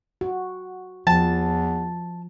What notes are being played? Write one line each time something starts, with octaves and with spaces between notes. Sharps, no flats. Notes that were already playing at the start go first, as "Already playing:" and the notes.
F#4
E2 F3 A5